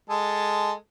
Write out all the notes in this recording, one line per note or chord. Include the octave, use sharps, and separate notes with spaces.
G#3 A4